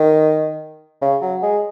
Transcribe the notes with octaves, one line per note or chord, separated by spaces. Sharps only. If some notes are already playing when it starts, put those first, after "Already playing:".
Already playing: D#3
C#3
F#3
G#3